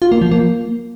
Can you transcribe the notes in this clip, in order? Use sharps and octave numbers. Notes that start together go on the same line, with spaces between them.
F4
A#3
F3
A#3